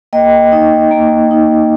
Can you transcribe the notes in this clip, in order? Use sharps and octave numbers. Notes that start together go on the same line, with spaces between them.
A#3 D#5 G5
D#4
A#3
D#4